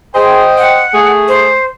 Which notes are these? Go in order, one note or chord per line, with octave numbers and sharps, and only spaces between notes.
G#4 C5 D#5 G5
F#5
A3 G#4
C5